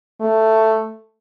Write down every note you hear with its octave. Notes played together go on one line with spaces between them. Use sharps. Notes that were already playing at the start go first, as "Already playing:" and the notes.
A3